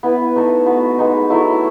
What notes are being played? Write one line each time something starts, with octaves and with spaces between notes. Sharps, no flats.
B3 E4 B4
A3 D#4 A4
B3 F#4 B4
G#3 B3 D#4
F#3 A3 E4 A4